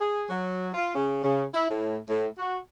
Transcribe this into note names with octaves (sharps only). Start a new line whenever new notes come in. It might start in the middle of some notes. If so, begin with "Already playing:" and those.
G#4
F#3
F4
C#3
C#3
E4
A2
A2
F#4